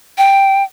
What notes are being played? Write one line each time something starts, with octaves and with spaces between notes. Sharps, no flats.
G5